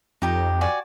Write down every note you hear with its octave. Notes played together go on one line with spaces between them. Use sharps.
F2 D#4 G4 A#5
F#4 D5 G#5